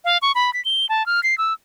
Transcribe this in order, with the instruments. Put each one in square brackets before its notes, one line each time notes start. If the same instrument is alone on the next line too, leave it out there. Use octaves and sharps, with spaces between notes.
[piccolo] F5
C#6
B5
B6
G7
A5
F6
C7
E6